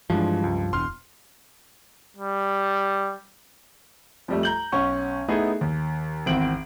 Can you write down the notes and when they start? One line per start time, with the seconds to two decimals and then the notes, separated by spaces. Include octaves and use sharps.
0.10 G2 E3 F3 G#3 D4
0.44 C#2
0.73 E1 C6 F6
2.17 G3
4.28 F2 G3 A3
4.43 A#5 G6 F#7
4.72 B1 C#4 F#5 C#6
5.28 A3 B3 D#4 E4 G#4
5.61 D#2
6.26 G#1 E2 C4 D7 F#7